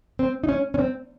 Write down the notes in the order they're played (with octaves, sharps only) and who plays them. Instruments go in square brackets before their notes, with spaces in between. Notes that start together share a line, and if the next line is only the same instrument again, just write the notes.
[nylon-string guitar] C4
D#4
C#4
C#4
C4